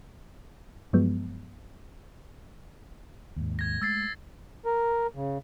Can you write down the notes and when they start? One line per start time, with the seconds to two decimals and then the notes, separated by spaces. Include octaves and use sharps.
0.93 G2 F3 F#3 G#3 B3
3.36 D#2 G#2
3.59 G#6 A#6
3.82 G#3 A3 E6 A6 C7
4.65 A#4
5.15 C#3